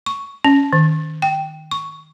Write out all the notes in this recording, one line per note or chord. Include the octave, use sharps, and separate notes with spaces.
C#6
C#4
D#3
G5
C#6